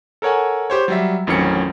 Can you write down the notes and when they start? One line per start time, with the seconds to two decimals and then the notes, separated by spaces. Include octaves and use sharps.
0.22 A4 A#4 C#5 F#5 G#5
0.70 G4 C5 C#5
0.88 F#3 G3 E5
1.27 A1 F2 D#3 F#3 C#4 C#7